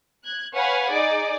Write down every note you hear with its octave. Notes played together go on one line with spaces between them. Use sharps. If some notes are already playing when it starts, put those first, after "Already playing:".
F#6 G#6
B4 C#5 F5 F#5 G#5 B5
D#4 G#4 D5